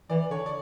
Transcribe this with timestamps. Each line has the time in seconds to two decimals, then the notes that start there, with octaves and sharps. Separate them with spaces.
0.10 E3 D5
0.31 D3 C#5
0.46 D5